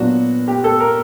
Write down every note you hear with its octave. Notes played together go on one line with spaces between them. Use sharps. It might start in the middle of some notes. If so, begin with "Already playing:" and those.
Already playing: A#2 F#3 B3 D4 F#4
G4
A4
A#4